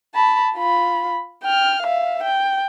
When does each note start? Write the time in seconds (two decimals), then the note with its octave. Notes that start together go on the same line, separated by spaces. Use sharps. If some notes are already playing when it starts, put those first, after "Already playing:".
0.14 A5 B5
0.56 F4 B5
1.43 G5 F6
1.82 E5 F5
2.23 G5